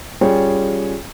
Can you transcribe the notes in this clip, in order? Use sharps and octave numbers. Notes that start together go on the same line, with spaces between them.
G3 C#4 F4 G#4 C#5 G5